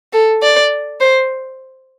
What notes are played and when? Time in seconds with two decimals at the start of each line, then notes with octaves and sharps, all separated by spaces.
0.13 A4
0.42 D5
1.00 C5